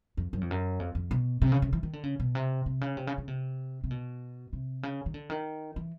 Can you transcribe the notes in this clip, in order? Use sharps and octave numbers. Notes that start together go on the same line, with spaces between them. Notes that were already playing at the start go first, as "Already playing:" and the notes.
F2
F#2
F2
F#2
F2
F2
B2
C3
C#3
C#3
E3
D#3
D3
C#3
B2
C3
C3
C#3
C3
C#3
C#3
C3
C3
B2
C3
C#3
D#3
D3
D#3
E3